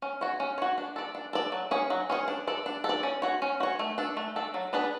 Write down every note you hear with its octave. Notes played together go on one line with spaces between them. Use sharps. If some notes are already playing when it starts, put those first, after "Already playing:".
C#4
F#4 C#5
C#4
F#4 C#5
D4
A4 D5
D4
A4 D5
F#3
C#4 G#4 C#5
F#3
C#4 G#4 C#5
D4
A4 D5
D4
A4
D5
C#4
F#4 C#5
C#4
F#4 C#5
A3
D4 A4
A3
D4 A4
F#3
B3 D4 G#4 B4